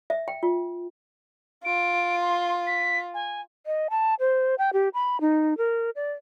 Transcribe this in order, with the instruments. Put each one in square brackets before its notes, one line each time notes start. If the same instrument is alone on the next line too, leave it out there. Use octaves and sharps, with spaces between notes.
[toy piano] E5
G5
F4
[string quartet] F4 [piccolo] D7
[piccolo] C6
B6
G#5
[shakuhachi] D#5
A5
C5
G5
G4
B5
D#4
A#4
D5